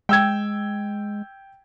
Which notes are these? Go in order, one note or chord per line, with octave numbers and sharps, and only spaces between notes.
G#3 G5 E6 G#6